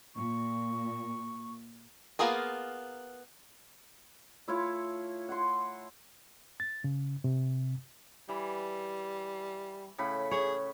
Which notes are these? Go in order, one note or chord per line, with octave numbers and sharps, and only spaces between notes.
A#2 C#6
A#3 B3 F4 G#4 A#4
A3 E4 F4 C#5
F#5 C6
A6
C#3
C3
E3 G3
A2 C#3 B5
G#4 C#5